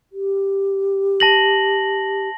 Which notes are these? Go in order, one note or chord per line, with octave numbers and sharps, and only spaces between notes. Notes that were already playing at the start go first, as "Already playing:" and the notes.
G4
A5 A#6 F#7